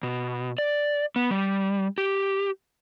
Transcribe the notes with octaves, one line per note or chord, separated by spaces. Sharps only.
B2
D5
B3
G3
G4